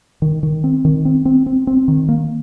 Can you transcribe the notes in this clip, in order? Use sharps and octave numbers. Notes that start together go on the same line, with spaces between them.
D#3
D#3
C4
D#3
C4
C4
C4
C4
D#3
A#3